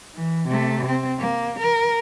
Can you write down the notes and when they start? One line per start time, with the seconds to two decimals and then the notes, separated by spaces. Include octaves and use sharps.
0.15 E3
0.48 C3 A3
0.87 C4
1.19 A#3
1.59 A#4